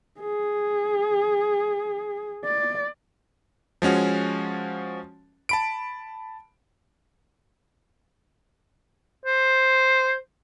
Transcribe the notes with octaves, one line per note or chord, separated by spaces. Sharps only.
G#4
D5
F3 G#3 C#4 F#4
A5 B5 D7
C5